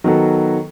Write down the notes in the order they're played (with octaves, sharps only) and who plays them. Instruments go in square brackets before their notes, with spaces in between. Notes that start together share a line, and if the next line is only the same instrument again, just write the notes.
[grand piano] D#3 F#3 B3 F#4 A4